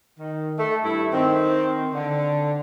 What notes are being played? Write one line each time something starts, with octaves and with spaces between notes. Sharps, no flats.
D#3
A3
G2 A3 E4
D#3 C4
D3